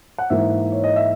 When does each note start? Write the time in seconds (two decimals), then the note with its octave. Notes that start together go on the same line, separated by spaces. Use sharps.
0.18 F#5
0.30 G#2 E3 A#3 E5
0.72 C#5
0.84 D#5
0.96 E5